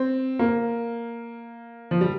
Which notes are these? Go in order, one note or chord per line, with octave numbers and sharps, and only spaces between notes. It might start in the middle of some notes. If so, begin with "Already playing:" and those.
Already playing: C4
A#3
F3
G3